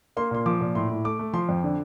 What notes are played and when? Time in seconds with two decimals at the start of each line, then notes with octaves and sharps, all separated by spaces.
0.17 A#3 C6
0.31 A#2 C6
0.46 F3 D6
0.61 A#2
0.75 A2 C6
0.90 A2
1.04 A3 D6
1.19 A3
1.33 F3 C6
1.49 F2
1.64 D3